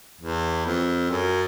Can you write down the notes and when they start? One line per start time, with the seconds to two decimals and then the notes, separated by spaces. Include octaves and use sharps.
0.21 E2
0.66 F2
1.10 F#2